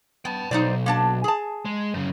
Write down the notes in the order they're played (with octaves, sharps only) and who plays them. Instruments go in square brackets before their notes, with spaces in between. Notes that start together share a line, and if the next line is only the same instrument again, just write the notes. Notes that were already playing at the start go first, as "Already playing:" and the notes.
[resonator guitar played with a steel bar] B3 [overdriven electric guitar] G5 A5
[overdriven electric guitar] B1 [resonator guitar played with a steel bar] D#4 C5 D5
[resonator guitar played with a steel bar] A#3 D4 A5
G#4 A5
[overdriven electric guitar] G#3
F#2 C#3